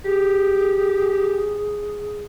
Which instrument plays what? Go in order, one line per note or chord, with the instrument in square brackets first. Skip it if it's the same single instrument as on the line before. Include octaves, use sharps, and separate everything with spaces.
[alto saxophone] G4 [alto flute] G#4